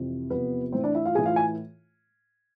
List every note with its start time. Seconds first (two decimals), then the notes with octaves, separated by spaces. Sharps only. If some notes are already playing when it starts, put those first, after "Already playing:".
Already playing: F2 C3 E3
0.30 E2 C3 F3 B3 B4
0.72 A2 E3 C4 C5
0.84 D4 D5
0.94 E4 E5
1.05 F4 F5
1.15 A2 E3 G#4 G#5
1.26 F4 F5
1.36 G#5